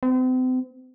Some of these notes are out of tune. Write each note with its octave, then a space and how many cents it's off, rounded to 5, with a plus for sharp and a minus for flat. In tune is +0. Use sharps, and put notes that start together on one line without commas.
C4 -40